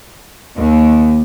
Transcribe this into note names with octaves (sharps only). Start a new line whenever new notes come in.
D#2